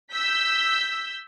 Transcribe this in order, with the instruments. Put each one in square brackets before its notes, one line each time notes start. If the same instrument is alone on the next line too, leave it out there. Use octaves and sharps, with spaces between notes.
[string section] E6 G6 B6